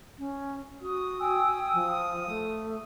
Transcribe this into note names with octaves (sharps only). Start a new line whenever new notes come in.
C#4
F#4 D#6
G5 G#5 E6
F3
A3 A4